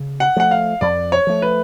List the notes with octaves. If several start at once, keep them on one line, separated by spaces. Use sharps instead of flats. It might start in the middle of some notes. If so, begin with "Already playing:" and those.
Already playing: C#3
F#5
F3 A3 F#5
F5
F2 D5
C#5
F3 A3
B4